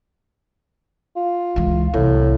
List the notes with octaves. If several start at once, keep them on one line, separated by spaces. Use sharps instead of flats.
F4
C#2 E3
C2 A2